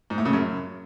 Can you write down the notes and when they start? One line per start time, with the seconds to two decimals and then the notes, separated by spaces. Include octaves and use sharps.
0.10 G#2
0.18 A2
0.25 C#3
0.33 F#2